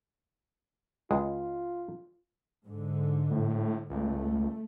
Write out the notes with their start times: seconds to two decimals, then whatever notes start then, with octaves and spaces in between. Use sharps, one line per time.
1.11 C#2 G#3 F4
2.65 G#2 D3
3.31 A2
3.90 C#2 A3